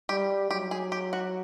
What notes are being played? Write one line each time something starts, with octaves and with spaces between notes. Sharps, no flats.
G3 G4
F#3 G4
G#4
G4
F#4